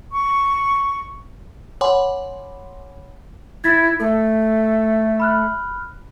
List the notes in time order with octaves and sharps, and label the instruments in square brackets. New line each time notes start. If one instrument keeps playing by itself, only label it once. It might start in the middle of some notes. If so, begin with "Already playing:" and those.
[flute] C#6
[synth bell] C#5 F#5 G#5 B5 C6 D6
[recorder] E4 [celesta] G#6 A6 B6
[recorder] A3 [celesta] A4
[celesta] B5 F6 F#6